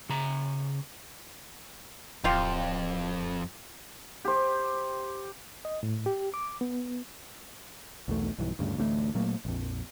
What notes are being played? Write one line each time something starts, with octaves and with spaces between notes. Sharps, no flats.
C#3 A#5
D1 F2 F3 F4 G4
G4 C5
D#5
A2
G4
D6
B3
B1 E2 A3
B1 G2 E3
D2 G2 C#3
A1 D2 D3 A3
A#2 F#3 A3 A#3
A#1 F2